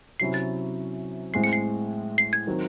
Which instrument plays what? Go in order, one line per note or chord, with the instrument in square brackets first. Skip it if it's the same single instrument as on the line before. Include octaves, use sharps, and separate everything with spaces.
[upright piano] C3 F#3 C#4 E4 [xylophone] C7
[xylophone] A6
[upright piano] A2 G#3 C4 [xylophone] C7
[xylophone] C#7
C7
C7
G#6
[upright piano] D#3 F#3 C4